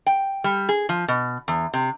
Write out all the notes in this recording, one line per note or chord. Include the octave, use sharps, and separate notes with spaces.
G5
G3
G#4
F3
B2
E2
C3